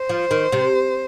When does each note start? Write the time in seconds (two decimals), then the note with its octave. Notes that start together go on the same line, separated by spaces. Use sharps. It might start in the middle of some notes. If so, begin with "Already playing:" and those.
Already playing: C5
0.09 F3
0.31 D#3
0.52 C3